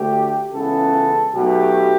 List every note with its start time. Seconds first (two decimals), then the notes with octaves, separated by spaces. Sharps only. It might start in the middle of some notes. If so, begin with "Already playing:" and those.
Already playing: D2 D3 A3 G4
0.52 C#2 C#3 E3 B3 A4
1.34 B1 B2 F#3 A3 G4